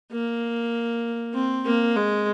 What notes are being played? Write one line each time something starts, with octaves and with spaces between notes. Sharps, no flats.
A#3
C4
A#3
G#3